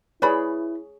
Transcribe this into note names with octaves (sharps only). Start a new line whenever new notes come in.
E4 G#4 B4 C#5 D5 B5